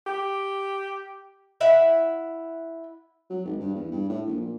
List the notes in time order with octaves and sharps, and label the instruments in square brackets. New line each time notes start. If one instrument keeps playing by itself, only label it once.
[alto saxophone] G4
[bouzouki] E4 E5 F#5
[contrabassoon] F#3
G#1
G2
E2
G2
A2
A#1
A#2